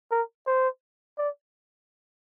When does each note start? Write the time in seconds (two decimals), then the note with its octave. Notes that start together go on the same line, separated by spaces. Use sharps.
0.11 A#4
0.47 C5
1.18 D5